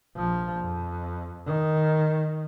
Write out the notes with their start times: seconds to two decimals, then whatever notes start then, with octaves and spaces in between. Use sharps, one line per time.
0.16 A#1 F3
0.59 F2
1.46 D#3